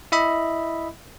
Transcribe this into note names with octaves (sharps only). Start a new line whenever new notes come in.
E4 D#5 E5 B5